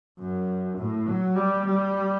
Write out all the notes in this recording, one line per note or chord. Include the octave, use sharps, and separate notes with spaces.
F#2
A2
F#3
G3
G3